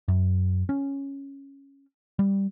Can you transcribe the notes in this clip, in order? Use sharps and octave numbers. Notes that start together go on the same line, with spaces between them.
F#2
C#4
G3